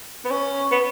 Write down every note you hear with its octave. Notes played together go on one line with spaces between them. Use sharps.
B3
C#4
B3